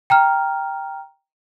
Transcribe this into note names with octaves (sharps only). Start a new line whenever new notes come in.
G5 A#5 F6